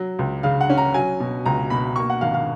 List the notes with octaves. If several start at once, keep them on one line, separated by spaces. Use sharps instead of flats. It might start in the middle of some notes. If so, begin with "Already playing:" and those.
Already playing: F#3
C#2
C#3 F5
F#5
C#4
A#5
F#3 G#5
B2
C#2 A#5
B2 B5
A#3 C#6
F#5
G#1 F5
F5